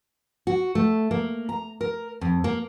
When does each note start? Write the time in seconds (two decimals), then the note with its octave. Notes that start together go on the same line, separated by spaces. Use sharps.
0.47 F#4
0.75 A3
1.11 A#3
1.49 A#5
1.81 A#4
2.21 F2
2.44 A#3